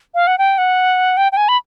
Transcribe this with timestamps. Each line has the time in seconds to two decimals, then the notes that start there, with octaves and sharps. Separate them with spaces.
0.15 F5
0.27 F#5
0.38 G5
0.58 F#5
1.17 G5
1.32 G5
1.37 G#5
1.48 B5